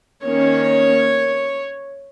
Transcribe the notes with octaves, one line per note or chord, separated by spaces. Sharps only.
D#3 A#3 C#4 C#5